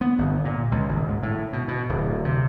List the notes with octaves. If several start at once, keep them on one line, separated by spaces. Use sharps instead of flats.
B3
G1
A#2
C#2
G#1
G#2
A2
B2
B2
D1
C3